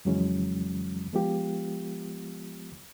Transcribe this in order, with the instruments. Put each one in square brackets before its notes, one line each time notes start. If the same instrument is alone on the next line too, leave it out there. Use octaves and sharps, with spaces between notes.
[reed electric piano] F2 C#3 E3 F#3 G#3 C#4
F3 G#3 B3 F4 G4